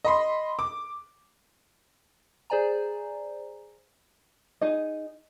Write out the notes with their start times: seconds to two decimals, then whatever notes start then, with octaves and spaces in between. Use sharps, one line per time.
0.05 D#5 B5 C6
0.59 D6
2.50 G#4 C5 D5 G#5 A#5
4.61 D#4 G#4 D#5